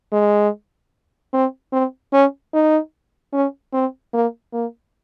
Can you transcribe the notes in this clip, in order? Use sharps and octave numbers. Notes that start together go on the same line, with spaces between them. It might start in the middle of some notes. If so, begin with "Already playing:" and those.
G#3
C4
C4
C#4
D#4
C#4
C4
A#3
A#3